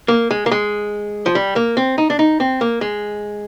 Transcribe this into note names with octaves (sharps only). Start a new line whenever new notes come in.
A#3
G#3
A#3
G#3
F3
G3
A#3
C4
D#4
D4
D#4
C4
A#3
G#3